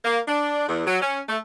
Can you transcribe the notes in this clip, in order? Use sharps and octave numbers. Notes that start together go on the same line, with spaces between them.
A#3
D4
E2
F#3
C#4
A3